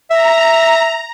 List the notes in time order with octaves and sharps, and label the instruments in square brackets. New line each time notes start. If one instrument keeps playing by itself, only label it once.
[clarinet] E5 [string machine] A#5